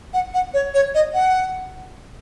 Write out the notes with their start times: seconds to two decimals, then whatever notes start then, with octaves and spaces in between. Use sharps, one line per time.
0.14 F#5
0.34 F#5
0.54 C#5
0.74 C#5
0.95 D#5
1.14 F#5